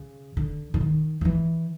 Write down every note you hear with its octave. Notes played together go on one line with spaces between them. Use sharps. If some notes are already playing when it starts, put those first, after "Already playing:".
Already playing: C#3
D3
D3
D#3
F3
E3